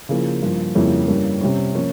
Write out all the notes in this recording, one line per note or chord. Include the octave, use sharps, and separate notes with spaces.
C#3 F3 A#3 E4
G2 F3 A#3
F2 C#3 G3 A#3 C#4 E4
G2 G3 A#3 C#4
C3 G3 C#4
F3 A#3 C#4 F4